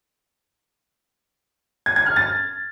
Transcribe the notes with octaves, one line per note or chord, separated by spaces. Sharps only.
G#6
G#6
F6
A6